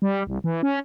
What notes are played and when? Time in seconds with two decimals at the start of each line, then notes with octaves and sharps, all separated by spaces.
0.02 G3
0.27 C2
0.44 E3
0.63 C#4